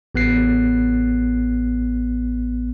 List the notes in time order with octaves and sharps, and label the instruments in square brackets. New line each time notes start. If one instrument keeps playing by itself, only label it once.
[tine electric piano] A1 B3 F#6 C7